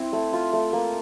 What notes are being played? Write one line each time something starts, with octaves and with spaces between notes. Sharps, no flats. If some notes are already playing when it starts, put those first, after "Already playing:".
Already playing: C4 E4
A3
F4
A3
A#3